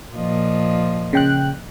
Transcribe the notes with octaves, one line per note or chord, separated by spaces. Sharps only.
A#2 F3 D#5
C#3 G5 F#6